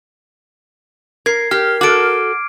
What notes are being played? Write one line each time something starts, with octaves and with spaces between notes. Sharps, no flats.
A#4 G#6 C7
G4 A#4 F6
F#4 A4 D6 D7